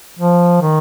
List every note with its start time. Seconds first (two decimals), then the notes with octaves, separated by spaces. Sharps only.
0.19 F3
0.61 D#3